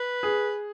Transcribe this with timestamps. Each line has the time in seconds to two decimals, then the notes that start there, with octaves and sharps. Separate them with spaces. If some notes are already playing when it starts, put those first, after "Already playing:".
Already playing: B4
0.23 G#4